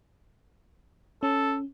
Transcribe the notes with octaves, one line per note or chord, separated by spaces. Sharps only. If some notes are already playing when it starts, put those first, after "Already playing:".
C#4 A4